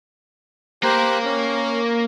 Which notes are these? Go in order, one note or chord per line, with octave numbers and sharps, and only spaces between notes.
A#3 G4 A#4 C5 F#6
C#4